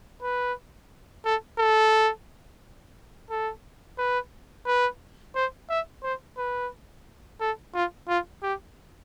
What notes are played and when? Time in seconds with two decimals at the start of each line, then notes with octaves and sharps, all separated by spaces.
0.22 B4
1.25 A4
1.58 A4
3.30 A4
3.98 B4
4.66 B4
5.35 C5
5.70 E5
6.03 C5
6.37 B4
7.40 A4
7.74 F4
8.08 F4
8.43 G4